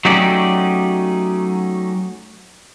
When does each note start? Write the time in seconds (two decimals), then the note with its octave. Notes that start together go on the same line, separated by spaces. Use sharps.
0.05 F#3 A3 C#4 D#4 G4 D5